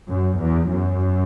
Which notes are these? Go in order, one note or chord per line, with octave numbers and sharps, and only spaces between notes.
F#2
E2
F#2